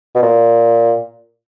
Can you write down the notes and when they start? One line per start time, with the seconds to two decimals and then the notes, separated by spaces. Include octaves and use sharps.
0.15 B2
0.22 A#2